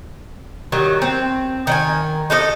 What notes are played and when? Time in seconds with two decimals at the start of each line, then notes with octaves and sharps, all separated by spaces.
0.72 D#3 F#3 G3
1.02 C4
1.67 D#3 D5 G#5
2.30 D#4 A4 A#4 D#5